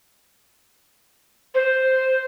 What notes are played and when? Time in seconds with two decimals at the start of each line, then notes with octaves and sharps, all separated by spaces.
1.55 C5